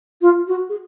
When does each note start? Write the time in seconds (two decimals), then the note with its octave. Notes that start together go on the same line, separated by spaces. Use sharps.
0.21 F4
0.47 F#4
0.69 G#4